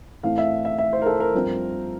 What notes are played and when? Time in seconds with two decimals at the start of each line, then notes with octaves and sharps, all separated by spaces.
0.23 A2 E3 A3 C4 F5
0.38 E5
0.65 E5
0.78 E5
0.93 C5
1.02 A#4
1.06 A4
1.20 A#4
1.34 G2 F3 C4